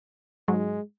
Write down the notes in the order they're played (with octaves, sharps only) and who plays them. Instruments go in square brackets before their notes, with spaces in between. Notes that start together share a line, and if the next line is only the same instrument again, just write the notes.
[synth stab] G#2 F#3 [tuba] G#3